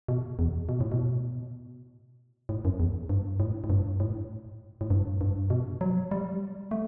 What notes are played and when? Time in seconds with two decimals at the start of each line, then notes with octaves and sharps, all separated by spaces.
0.08 B2
0.39 E2
0.69 B2
0.81 A2
0.92 B2
2.49 A2
2.65 F#2
2.80 E2
3.09 G2
3.40 A2
3.64 A2
3.70 G2
4.00 A2
4.81 A2
4.90 G2
5.21 G2
5.50 B2
5.81 F#3
6.11 G3
6.71 A3